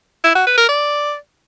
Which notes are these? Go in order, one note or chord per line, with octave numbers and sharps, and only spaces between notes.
E4
F#4
B4
A#4
D5